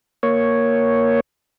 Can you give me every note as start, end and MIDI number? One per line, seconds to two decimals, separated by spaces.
0.23 1.20 58
0.23 1.20 73